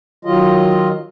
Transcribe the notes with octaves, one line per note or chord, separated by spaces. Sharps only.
D#3 F#3 F4 D#5